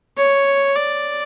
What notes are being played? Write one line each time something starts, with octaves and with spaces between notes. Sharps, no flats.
C#5
D5